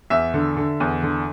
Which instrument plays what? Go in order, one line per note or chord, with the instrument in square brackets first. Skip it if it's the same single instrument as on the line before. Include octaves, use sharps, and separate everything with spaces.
[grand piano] E2 E5
D3
D3
E2
D3